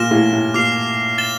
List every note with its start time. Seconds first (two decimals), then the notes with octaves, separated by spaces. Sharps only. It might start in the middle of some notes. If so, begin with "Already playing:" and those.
Already playing: A#2 F6 A#6 E7 G7
0.11 A2
0.33 A2
0.54 A#2 D6 F6 C7 F7
1.18 A6 E7 G7